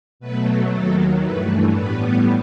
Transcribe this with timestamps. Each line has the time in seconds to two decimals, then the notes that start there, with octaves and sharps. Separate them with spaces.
0.20 B2 F#3 A3 B4
0.71 D#2 D#3 F#3 A4
1.22 G2 E3 A3 B4
1.74 A2 G3 B3 B4